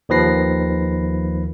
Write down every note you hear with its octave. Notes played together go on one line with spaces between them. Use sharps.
D#2 D#3 F3 B4 A#6 C7